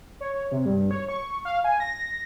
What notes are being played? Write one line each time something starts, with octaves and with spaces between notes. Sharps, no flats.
C#5
C3
G2
C#5
C#6
F5
G#5
A#6